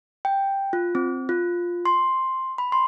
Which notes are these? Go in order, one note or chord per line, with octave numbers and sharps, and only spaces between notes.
G5
F4
C4
F4
C6
B5
C6